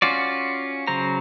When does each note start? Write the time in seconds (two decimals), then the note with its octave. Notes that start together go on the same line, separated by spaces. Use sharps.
0.02 C#4 F4 F#4 D5
0.87 C#3 F#3 C5 A#5